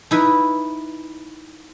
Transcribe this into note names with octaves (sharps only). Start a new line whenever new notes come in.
D#4 E4 B4